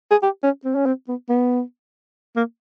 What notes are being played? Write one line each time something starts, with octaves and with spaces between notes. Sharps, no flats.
G#4
G4
C#4
C4
C#4
C4
B3
B3
A#3